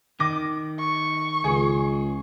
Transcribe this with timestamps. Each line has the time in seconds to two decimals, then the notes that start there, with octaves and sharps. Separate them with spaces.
0.20 D#3 D6 A#6
0.79 C#6
1.44 C#2 G#4